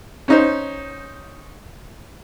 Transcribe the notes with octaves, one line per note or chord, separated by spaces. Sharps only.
C#4 D#4 C5